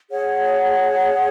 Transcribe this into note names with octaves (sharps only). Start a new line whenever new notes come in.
G#4 C#5 F#5